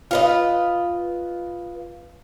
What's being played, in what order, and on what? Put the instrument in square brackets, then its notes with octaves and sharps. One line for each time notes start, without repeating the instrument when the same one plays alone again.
[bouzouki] F4 B4 D#5